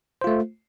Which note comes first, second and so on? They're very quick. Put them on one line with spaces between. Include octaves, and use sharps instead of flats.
C5 F4 A3